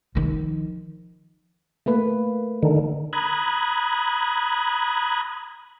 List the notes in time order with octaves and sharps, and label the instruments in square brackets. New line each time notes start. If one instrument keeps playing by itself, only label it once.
[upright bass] D#3 F3
[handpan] A3 A#3 B4
[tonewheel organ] D3 D#3
A#5 B5 D#6 F#6 G#6